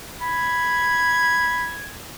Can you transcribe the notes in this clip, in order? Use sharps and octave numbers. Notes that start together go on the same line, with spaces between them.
B5 G#6